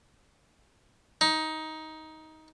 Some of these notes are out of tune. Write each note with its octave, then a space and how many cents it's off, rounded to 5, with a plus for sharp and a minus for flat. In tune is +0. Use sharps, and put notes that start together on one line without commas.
D#4 +15